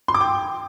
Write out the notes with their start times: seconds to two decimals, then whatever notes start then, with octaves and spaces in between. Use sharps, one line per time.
0.08 C6
0.15 D6
0.21 G5